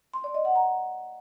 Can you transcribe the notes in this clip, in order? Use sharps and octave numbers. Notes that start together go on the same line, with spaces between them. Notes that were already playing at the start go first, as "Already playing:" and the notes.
C6
D5
D#5
F#5
A#5